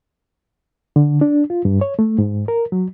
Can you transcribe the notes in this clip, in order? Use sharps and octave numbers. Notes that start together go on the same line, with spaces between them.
D3
D4
F4
G2
C#5
A3
G#2
A#4
F#3